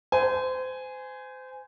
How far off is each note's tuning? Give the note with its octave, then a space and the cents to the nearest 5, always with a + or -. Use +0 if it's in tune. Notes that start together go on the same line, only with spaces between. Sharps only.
C5 -30 G#5 +0